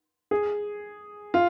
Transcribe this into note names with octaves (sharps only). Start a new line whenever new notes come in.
G#4
F4